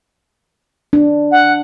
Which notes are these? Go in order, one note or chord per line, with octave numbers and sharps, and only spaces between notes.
D4
F#5